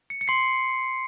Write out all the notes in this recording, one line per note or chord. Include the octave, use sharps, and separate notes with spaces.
C#7
C#7
C6 C7